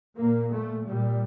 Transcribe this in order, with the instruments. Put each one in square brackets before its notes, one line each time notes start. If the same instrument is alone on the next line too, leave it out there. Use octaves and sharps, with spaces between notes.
[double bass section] A#2 A#3
A3
A#2 G3